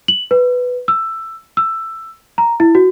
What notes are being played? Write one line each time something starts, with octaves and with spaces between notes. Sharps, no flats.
F#7
B4
E6
E6
A#5
E4
F#4